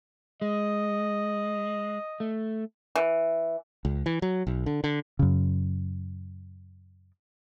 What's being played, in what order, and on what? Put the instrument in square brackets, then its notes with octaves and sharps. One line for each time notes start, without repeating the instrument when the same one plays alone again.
[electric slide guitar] G#3 [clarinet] D#5
[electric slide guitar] A3
[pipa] E3
[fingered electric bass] C#2
E3
F#3
B1
D3
D3
F#2 C#3